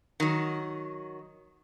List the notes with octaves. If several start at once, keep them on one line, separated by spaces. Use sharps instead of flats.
D#3 F#3